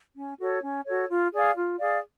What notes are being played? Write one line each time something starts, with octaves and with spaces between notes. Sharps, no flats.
C#4
F#4 A4 C#5
C#4
F#4 A4 C#5
F4
G#4 D5 F5
F4
G#4 D5 F5